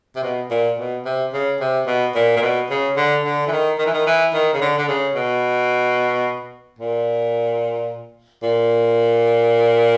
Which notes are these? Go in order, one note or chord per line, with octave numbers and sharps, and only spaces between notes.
C3
B2
A#2
B2
C3
C#3
C3
B2
A#2
A#2
B2
C#3
D3
D3
E3
D#3
D#3
E3
D#3
E3
D#3
C#3
D3
D3
C#3
B2
A#2
A#2